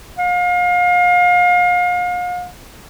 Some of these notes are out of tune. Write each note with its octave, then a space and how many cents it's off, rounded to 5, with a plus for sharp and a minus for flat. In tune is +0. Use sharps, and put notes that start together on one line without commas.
F5 +35